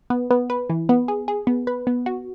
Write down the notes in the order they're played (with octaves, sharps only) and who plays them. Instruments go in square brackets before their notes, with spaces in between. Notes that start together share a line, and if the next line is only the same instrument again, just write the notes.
[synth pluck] B3
B3
B4
E3
B3
G#4
G#4
B3
B4
B3
F#4